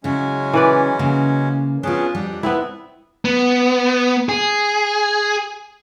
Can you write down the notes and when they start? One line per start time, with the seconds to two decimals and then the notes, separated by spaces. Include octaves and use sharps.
0.04 C#3 F#3 G#3 C#4 E4
0.53 E3 B4 D5
0.99 C#3 A#3
1.83 B3 C#4 D4 F4 G#4
2.15 F2 G3 D4
2.43 B3 C4 E4 E5
3.25 B3
4.29 G#4